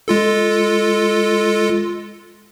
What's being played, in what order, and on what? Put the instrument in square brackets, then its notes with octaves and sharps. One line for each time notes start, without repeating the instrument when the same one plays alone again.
[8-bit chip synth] G#3 F4 A4